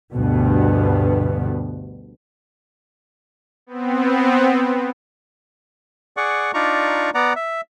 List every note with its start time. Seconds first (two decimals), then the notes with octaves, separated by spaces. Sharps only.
0.13 D2 G2 B2 B3
3.67 B3 C4
6.17 G#4 D5 F#5 C#6
6.54 D4 D#4 F4 D5 A#5 C#6
7.14 B3 D5 F#5 A#5
7.36 E5